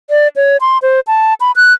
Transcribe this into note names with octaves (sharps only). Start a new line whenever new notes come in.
D5
C#5
C6
C5
A5
B5
F#6